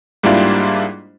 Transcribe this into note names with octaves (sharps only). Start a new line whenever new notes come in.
G#2 G3 A#3 D4 E4 F4